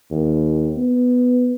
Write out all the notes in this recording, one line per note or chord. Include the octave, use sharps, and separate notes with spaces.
D#2
B3